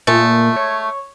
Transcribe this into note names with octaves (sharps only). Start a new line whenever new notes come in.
A#2 G#3 A3
C#5